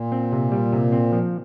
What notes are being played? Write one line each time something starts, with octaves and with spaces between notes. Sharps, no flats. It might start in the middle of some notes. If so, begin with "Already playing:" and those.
Already playing: A#2
C4
C3
G3
C3
C4
F3